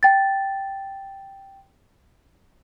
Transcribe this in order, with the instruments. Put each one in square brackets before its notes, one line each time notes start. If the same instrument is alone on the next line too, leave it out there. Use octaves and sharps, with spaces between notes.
[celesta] G5 A6